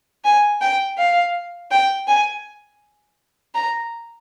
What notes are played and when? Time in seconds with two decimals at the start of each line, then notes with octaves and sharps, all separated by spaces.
0.25 G#5
0.62 G5
0.98 F5
1.71 G5
2.08 G#5
3.54 A#5